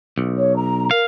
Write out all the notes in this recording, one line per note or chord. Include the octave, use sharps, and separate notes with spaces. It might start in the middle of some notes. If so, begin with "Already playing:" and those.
B1
C#5
A#5
A#4 F5